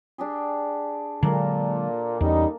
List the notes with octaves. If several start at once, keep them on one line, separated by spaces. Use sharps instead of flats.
D4 G4 G#4
A#2 D3 F#3 G#3 A#3 A4 A#5
E2 G3 C#4 D#4